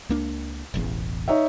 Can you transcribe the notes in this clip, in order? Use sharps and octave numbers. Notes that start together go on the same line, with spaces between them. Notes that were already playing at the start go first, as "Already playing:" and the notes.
C#2 A#3 D4
E1 A1 E2
D#4 C#5 E5